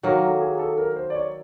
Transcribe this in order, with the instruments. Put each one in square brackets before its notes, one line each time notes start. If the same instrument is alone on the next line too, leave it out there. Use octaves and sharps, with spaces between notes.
[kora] D#3 F#3 A#3 [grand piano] A#4
[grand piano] A4
G#4
A4
A#4
C5
D5
C#5